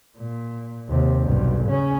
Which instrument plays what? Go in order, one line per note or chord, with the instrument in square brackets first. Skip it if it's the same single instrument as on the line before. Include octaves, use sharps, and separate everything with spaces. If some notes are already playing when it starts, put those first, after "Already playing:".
[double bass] A#2
D#2 C3
B1 G2
C#3 C#4